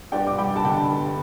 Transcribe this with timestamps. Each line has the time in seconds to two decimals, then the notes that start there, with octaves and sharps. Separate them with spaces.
0.12 G2 D5 G5
0.27 D6
0.38 G3 G5 B5
0.56 A5
0.64 D3 G5 B5
0.90 G2